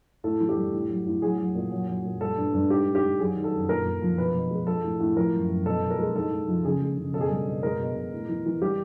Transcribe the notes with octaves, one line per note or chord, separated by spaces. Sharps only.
A2 A4
E3
G4
G3
A2
F#3
A2
F#3 G#4
F#3
A#2
F#3
F#3
A#2
G3 A4
G2
G2
G#2 G4
G#2
G4
G#2
F#3 G#4
D#3
A4
F#2
A#2 A#4
A#2
F3
B2 B4
B2
G#3
F3 A4
A2
A2
F3 A#4
F#2
F#2
B2 A4
B2
A#4
G#3
G#2 A4
G#2
F3
C#3 G#4
G#3
C#3
B2 A4
G#4
G3 A4
B2
G#3 A#4
B2
B2
A2
E3
E3
G3 G4